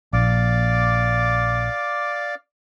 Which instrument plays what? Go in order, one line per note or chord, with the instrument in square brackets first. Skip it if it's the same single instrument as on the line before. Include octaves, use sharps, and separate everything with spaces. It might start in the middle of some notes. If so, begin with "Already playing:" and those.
[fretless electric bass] A#1 [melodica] D5 F5 D6